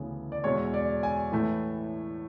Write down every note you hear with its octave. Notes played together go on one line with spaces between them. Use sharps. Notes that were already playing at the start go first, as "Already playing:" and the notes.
Already playing: D2 C#3 E3 B3
D5
E2 B2 G#3 C#5
D5
G#5
A2 E3 A3